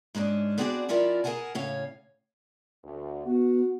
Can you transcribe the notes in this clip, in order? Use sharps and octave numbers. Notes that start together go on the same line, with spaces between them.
G#2 G#3 C#4 D4
B3 C4 D4 F#4 G#4 D5
F3 C#4 E4 F4 A#4 D5
G#4 A#4 D5 F#5 G#5 A5
A2 C#3 C#4 C#5 F5
D2
B3 F#4